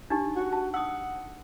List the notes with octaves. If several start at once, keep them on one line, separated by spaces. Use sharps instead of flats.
D4 D#4 G4
F#4
A5
F#5 D#6 E6